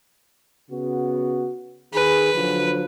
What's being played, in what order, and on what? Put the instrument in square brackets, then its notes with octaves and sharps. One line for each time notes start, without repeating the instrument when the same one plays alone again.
[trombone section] C#3 B3 F#4
[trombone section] D#3 G#4 [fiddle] B4
[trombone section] D3 F3 F#3